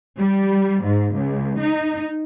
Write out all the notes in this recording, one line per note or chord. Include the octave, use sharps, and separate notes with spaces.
G3
G#2
C#2
D#4